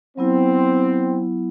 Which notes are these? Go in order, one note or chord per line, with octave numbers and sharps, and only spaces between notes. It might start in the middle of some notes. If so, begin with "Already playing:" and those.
F#3 B3 C4 E4